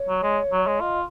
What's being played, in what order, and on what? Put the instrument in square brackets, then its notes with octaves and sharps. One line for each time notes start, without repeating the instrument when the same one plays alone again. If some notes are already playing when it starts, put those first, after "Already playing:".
Already playing: [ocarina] C#5
[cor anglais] F#3
G#3
F#3
G#3
[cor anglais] F4 [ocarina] D#5